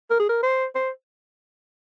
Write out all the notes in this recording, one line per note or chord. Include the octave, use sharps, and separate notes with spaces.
A#4
G#4
A#4
C5
C5